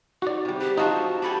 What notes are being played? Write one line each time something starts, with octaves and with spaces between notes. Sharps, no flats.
D#4 F#4 D5
C3 G3
G4 B4
D#4 F4 F#4 C5 A5
G4 A4 G#5 B5